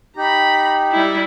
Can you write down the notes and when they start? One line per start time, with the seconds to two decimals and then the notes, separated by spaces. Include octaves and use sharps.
0.17 D#4 G4 A#5 B5
0.92 G3 E4